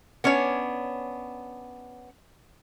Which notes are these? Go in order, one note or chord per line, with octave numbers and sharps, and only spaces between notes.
B3 C#4 D4 C#5